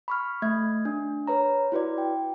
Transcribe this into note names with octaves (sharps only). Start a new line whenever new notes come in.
B5 C#6 F6
A3 E5 G#6
D4
B4 C#5 A#5
E4 F#4 B4 D5
G5